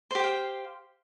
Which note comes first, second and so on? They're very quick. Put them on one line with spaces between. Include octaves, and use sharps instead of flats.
C5 G4 G5 F5